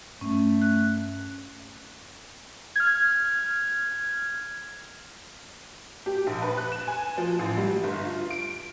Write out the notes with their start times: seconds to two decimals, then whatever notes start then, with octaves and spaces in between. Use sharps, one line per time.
0.21 G2 A3 C#4
0.62 F#6
2.76 F6 G#6
6.06 G4
6.27 A#1
6.42 B4
6.57 F#6
6.72 E7
6.87 G#5
7.17 F3
7.39 A1
7.57 G3
7.83 G1
8.06 F4
8.31 D7